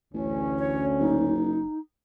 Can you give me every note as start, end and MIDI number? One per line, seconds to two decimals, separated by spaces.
0.14 0.85 33
0.14 1.36 38
0.14 1.36 61
0.58 0.84 73
0.99 1.64 30
0.99 1.78 63